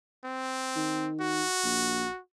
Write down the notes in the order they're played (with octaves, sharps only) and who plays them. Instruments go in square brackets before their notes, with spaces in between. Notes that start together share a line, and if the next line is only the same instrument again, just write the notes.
[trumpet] C4
[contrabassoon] D#3
[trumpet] F#4
[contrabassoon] A#1